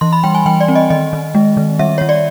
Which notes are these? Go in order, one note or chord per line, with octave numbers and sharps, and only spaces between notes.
E3 C6
B5
G3 G5
G#5
E3 G5
D5
C4
D#5
D#3 D#5
D#3
G#3
D#3
G3 E5
G3 C#5
D5